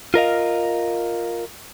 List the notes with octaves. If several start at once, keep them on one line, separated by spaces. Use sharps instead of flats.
F4 A#4 D#5 F5